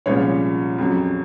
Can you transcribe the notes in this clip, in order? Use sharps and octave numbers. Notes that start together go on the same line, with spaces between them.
C2 A#2 F3 G#3 C#4 C#5
F2 C#3 F#3